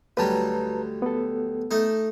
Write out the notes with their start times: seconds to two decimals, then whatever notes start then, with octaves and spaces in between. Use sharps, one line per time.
0.17 D2 F#3 G3 B4 A5 A#5
1.02 B3 A4
1.71 A3 D#4